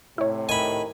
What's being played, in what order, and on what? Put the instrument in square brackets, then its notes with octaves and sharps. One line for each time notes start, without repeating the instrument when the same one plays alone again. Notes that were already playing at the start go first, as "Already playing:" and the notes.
[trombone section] A2 C3 [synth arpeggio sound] E4 C#5
[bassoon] D#3 [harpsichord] G#5 B5